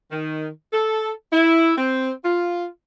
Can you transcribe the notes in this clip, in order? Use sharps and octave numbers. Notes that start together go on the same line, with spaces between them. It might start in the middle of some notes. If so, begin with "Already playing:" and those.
D#3
A4
E4
C4
F4